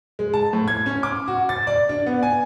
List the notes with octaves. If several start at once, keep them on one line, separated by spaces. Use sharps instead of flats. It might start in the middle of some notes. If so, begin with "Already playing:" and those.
G#3
A5
A2
G#6
C#4
D6
F#4
A6
D5
D4
B3
G#5